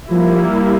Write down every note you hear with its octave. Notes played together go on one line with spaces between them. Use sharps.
F3 G3 A#3 E4